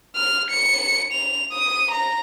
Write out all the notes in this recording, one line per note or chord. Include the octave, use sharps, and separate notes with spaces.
F6
C#7
F7
D#6
A#5